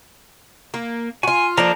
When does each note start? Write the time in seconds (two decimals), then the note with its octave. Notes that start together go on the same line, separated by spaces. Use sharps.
0.74 A#3
1.23 F4 F#4 G#5
1.57 F3 A#3 D4 A4 A#4 A#5